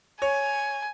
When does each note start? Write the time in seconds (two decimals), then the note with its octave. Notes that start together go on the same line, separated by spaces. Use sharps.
0.22 C#5 G#5